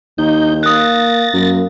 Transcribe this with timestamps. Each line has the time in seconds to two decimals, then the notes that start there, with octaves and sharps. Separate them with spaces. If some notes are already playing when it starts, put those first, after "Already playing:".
0.18 D#2 D#4 G6
0.63 A#3 D#6 F#6 A6 A#6
1.34 F#2 A#3